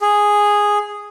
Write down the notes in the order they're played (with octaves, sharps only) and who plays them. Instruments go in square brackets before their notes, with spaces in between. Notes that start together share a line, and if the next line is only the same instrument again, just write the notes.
[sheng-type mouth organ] G#4